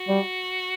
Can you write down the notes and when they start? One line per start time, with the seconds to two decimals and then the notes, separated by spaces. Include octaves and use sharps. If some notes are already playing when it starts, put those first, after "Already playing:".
Already playing: F#4
0.09 G3